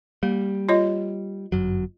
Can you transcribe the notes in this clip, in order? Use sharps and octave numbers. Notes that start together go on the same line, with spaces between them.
G3 A#3
F4 C#5 D#5
G1 F#2 F#3